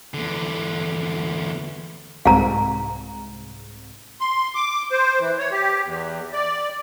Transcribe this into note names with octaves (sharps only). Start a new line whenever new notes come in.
E2 D3
C2 G#2 F5 A#5
C6
D6
C5
E3
C#5
G4
E2
D5